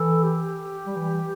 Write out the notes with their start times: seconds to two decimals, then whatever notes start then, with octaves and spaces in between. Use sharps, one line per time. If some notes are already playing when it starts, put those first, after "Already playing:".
Already playing: E3 A4
0.23 G4
0.87 G3
0.96 E3